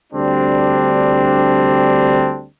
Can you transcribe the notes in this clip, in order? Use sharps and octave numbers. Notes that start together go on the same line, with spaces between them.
D2 G3 C4 D4